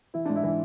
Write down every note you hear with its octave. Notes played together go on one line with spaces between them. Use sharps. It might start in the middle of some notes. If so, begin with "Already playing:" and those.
E3 E4
G#2 D4
E4
E3